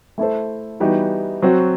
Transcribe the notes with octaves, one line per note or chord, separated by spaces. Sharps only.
A3 E4 A4 C5
E3 G3 B3 D#4 F#4
F#3 C4 F#4